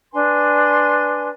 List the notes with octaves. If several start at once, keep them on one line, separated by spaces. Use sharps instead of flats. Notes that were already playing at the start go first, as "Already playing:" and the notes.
D4 B4 G#5 C6